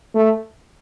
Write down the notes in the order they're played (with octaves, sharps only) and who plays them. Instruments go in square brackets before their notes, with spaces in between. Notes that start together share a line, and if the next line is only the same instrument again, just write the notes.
[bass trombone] A3